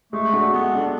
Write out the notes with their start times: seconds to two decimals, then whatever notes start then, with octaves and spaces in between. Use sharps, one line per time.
0.12 G#3 A3
0.33 D4 F#4 A4
0.53 G#3 B3
0.73 D4 F#4 A4